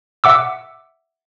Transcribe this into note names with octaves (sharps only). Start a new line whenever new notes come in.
E5 F#5 D6 E6